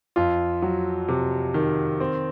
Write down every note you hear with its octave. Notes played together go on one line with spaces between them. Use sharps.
F2 F4
F#3
C3
D#3
C4